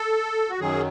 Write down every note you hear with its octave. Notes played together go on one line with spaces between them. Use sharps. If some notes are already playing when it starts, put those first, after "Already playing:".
Already playing: A4
F#4
F#2 D#3 F#3 G#4